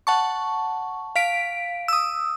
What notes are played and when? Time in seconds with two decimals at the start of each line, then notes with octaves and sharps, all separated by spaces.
0.07 F#5 A5 C#6
1.16 F5 B6 D7
1.88 D#6 E6